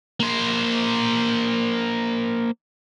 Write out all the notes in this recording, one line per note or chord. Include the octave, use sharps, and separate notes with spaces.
A#3 C5